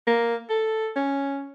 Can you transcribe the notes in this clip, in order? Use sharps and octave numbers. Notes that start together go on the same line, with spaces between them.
A#3
A4
C#4